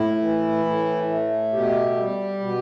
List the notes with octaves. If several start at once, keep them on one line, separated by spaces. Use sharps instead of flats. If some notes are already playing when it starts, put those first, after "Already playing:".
Already playing: A2 E4
E3
A2
A3
B2 G4
G3
B2